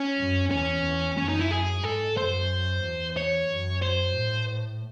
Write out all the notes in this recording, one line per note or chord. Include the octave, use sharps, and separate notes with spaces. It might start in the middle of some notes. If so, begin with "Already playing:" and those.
Already playing: C#4
F#2
E2 C#4
E2
F#2 C#4
D#4
E4
G#4
G#2 A4
F#2 C5
E2
C#5
F#2
C5
A2